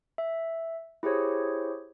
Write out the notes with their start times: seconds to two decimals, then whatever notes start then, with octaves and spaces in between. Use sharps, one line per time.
0.18 E5
1.03 E4 G4 G#4 C5 C#5